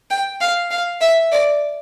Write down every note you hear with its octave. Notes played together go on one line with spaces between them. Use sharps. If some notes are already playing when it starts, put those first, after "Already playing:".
G5
F5
F5
E5
D5